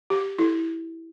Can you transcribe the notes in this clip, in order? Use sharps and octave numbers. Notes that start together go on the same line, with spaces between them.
G4
E4